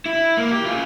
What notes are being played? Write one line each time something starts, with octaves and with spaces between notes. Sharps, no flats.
E4
A#3
G4
F4 G#4